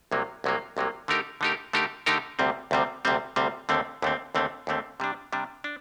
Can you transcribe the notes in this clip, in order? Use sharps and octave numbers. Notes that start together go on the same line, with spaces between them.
C2 C3 F#3 A#3
C2 C3 F#3 A#3
C2 C3 F#3 A#3
D3 A3 D#4 G4 A#4
D3 A3 D#4 G4 A#4
D3 A3 D#4 G4 A#4
D3 A3 D#4 G4 A#4
D2 C3 G3 C4
D2 C3 G3 C4
D2 C3 G3 C4
D2 C3 G3 C4
D#2 D3 A3 C4
D#2 D3 A3 C4
D#2 D3 A3 C4
D#2 D3 A3 C4
C3 G3 D4
C3 G3 D4
D4